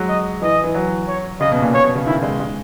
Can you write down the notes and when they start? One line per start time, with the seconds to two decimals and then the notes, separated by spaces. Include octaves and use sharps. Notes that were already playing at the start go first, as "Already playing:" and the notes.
Already playing: F#3 G#3
0.09 D#5
0.42 E3 D#5
0.64 E3
0.74 F#3
1.08 C#5
1.40 C#3 D#5
1.52 B2
1.62 A#2
1.74 C#5
1.84 B2
1.95 C#3
2.06 D#3 E4
2.23 G#3
2.40 G#3